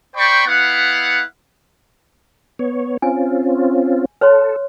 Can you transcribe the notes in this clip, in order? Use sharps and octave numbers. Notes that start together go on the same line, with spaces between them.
C5 D5 G5 B5 C#6
B3 E4 F5 F#5
B3 C#5
C4 C#4 F4 G#5
A4 B4 C#5 C6